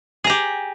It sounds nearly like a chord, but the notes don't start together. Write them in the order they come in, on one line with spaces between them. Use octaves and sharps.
G#4 A#5 G4